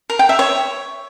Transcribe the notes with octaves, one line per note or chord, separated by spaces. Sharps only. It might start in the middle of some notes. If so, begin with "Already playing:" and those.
A#4
G5
E5
C#5